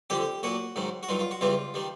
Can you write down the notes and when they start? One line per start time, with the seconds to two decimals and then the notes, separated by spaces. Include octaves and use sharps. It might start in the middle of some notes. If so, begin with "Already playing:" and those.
0.10 F2 D3 G3 G4
0.43 A#2 F#3 F#4
0.76 G#2 D#3 F#3
1.03 F#4
1.09 G2 D#3 F#3 F4
1.19 F4
1.31 F#4
1.41 E2 C#3 E3 G3 F4
1.74 D#3 G3